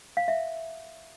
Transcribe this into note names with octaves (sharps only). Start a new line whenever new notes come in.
F5
E5